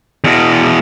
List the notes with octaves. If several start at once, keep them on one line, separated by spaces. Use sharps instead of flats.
E2 B2